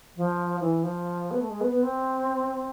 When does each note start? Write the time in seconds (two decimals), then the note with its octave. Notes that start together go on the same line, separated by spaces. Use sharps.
0.17 F3
0.61 E3
0.83 F3
1.31 B3
1.41 A3
1.50 G#3
1.61 B3
1.71 B3
1.83 C4